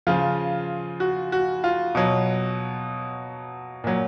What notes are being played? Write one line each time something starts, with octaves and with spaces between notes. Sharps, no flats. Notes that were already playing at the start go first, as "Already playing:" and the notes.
C#3 F3 F4
F#4
F#4
F4
B2 F#3
A#2 F#3